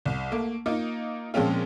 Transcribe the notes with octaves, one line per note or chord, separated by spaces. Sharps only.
C2
A3 A#3
A#3 D#4 F4
A#2 F3 G#3 C4 C#4 F4